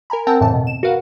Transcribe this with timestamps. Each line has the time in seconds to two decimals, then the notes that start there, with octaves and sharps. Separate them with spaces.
0.10 A#4 G#5 A#5 B5
0.27 C4 A#4 F#5 G5 A5
0.40 F2 A2 C#3 E3 A5
0.54 B2
0.67 E7
0.83 F#4 A#4 B4 F5 F#5